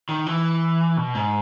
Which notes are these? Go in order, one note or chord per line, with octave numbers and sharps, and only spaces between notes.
D#3
E3
B2
G#2